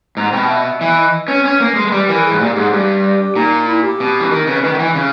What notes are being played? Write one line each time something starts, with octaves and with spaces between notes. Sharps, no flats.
G#2 A#5
B2 G5
E5
E5
E3 E5
D#5
C#4 B4
C#4
A#3
G#3
G#3
G3
E3 A#4
G#4
G#2
A#2 G4
G#2 G#4
G2 G4
A#2 D#4
E4
G4
B2
E3
D#3 A#4
C#3 B4
D#3 B4
D#3
E3
C#3